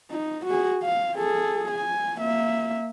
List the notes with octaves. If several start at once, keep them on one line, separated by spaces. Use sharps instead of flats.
D#4
F#4 G#4
F5
G#4 A4
G#5
A#3 E5